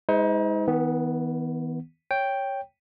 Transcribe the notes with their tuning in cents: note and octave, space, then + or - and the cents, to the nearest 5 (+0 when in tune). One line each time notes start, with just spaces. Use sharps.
G#3 -15 D#4 +40 C5 -40
D#3 +45 B3 +0
C#5 +0 G5 +0